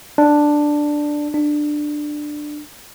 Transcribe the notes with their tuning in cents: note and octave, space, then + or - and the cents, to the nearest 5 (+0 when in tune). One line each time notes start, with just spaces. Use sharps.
D4 +5
D4 +15